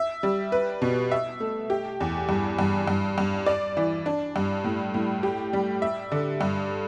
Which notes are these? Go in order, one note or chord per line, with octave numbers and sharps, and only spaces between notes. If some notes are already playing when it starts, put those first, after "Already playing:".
Already playing: E5
G3
B4
B2
E5
A3
G4
E2
G2
G2
G2
G2
D5
E3
D4
G2
A2
A2
G4
G3
E5
D3
G2